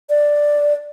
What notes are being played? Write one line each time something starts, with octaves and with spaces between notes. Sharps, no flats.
D5